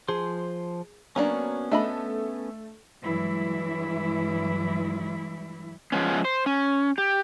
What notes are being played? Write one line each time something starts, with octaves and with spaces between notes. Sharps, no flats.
F3 G#4 C5 C6
F#3 A#3 B3 C#4 D4
A3 D4 A4 D#5 E5 B5
G2 E3 F#3 G#3 E4
F3 G#3 B3 C#4
C5
C#4
G4